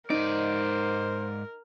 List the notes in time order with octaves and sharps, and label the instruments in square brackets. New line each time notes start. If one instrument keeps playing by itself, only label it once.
[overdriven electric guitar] G#2 D5 [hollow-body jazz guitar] D#4 [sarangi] A#4 [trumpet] C5